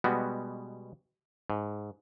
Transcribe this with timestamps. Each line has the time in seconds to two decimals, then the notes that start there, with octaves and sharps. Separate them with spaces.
0.04 B2 G3 G#3 B3 F#4
1.50 G#2